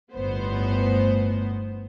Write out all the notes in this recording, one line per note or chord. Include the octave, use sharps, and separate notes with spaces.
G1 A2 B3 C5